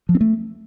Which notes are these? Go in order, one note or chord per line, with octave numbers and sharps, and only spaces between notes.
F3
C4
A3